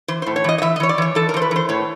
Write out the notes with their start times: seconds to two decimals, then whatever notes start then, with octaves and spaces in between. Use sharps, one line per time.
0.08 E3 C5
0.22 A2 C5
0.36 C#5
0.44 E3 D#5
0.58 D#5
0.62 E3 E5
0.76 D#5
0.80 E3 C#5
0.89 D5
0.98 E3 C#5
1.15 E3 A4
1.29 A#4
1.34 E3 C5
1.42 B4
1.51 E3 C5
1.69 A2 C#5